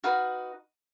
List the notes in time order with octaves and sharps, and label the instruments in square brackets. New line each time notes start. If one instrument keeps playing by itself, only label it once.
[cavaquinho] D#4 F#4 B4 F5